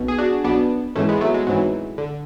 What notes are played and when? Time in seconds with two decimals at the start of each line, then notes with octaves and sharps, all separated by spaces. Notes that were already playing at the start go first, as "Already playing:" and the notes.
Already playing: B1 B2
0.08 G#4
0.18 D4 F#4
0.44 B1 B2 B3 D4
0.95 G#1 G#2 E3 A3 C#4
1.09 G#3 B3
1.21 F#3 A3
1.34 G#3
1.47 G#1 G#2 E3 F#3
1.98 D3